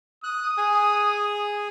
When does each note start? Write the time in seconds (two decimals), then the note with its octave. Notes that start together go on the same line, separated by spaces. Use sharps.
0.24 D#6 F#6
0.58 G#4 G#5